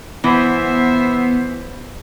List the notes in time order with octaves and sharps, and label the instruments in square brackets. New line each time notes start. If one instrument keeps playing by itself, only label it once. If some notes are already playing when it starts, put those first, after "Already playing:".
[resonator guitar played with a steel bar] E3 [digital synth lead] B3 [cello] C5 E5